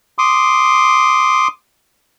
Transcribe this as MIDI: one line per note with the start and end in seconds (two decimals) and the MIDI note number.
0.18 1.48 84
0.18 1.48 86
0.18 1.48 87